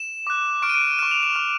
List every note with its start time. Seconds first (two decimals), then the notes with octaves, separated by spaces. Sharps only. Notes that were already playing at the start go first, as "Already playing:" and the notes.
Already playing: E7
0.27 D6 F#6
0.62 C#6 F6 D7
0.69 D#7
0.75 D7
0.99 C#6 F6 E7
1.11 F7
1.23 E7
1.36 C#6 F6